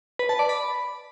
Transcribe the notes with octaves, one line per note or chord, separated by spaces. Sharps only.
B4
A5
D5
B5